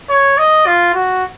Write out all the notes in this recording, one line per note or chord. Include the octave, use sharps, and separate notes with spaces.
C#5
D#5
F4
F#4